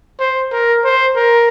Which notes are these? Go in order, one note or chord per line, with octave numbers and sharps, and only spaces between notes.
C5
A#4
C5
A#4